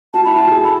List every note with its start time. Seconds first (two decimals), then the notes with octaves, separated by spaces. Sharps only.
0.13 F#4 A5
0.24 E4 B5
0.35 F#4 A5
0.51 G#4
0.63 A4 B5